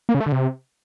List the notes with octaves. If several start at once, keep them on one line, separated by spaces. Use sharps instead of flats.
A#3
C#3
A3
D3
C3